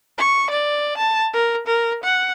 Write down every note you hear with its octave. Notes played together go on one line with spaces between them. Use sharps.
C#6
D5
A5
A#4
A#4
F#5